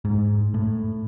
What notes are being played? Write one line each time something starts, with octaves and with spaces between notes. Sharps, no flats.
G#2
A2